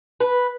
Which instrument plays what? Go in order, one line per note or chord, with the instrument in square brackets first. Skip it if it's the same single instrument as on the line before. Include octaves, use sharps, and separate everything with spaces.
[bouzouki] B4